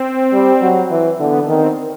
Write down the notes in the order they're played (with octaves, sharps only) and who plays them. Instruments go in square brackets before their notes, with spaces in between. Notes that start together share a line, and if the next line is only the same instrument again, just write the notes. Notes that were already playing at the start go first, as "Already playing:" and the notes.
Already playing: [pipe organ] C4
[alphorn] G3
F#3
E3
[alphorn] D3 [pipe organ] B3
[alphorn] D#3 [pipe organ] C4